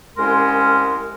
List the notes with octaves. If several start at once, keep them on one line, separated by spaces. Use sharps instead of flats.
C2 G#3 C#4 A#4 C6